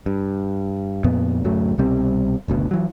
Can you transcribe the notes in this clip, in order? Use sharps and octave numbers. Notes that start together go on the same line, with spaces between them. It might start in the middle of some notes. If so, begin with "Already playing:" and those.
G2
F2 A#2 B3
D1 F#2 F#3 A3
C2 B2 G3 C4
F#1 D2 B2
E3 F#3